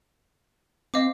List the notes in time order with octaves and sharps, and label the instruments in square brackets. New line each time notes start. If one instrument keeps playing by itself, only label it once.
[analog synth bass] C4 [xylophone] D#5 F5 D6